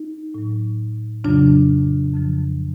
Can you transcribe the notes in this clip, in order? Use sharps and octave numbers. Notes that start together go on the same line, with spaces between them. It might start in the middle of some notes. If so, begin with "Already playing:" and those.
Already playing: D#4
A2 F#3
F2 C#3 F#3 D4
F2 C#3 F3